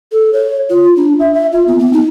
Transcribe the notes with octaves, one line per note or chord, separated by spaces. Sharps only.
A4
C#5
F4
D4
E5
E5
F4
B3
B3
D#4